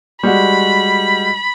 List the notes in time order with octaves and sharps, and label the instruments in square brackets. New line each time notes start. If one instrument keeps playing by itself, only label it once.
[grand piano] G3 G#3 F#4 [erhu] B5